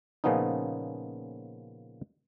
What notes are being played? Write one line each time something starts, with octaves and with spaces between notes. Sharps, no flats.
A#2 C#3 F3 B3 C#4 D#4